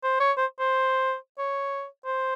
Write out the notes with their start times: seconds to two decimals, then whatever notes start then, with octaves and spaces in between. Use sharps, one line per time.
0.03 C5
0.20 C#5
0.37 C5
0.60 C5
1.38 C#5
2.06 C5